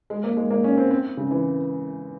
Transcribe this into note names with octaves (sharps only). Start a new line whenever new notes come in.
G#3
A#3
G#3
A#3
C#4
C4
C4
C#3
E3